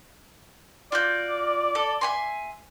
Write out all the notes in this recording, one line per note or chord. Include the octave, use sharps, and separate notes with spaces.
F4 F#4 D5 G6
A4
E5 G#5 C6